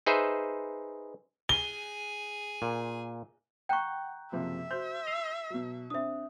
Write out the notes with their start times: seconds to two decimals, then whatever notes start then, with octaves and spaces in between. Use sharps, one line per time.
0.06 D#4 G#4 B4 C5 E5
1.49 G#4 G#5 G7
2.62 A#2
3.69 F#5 G5 A#5 C#6 F#6 G6
4.32 F#1 C3 F3 E5
4.71 F#4 C5 C6 G6
5.07 E6 C7 F7
5.50 B2 F#3
5.90 C4 D4 E5 D#6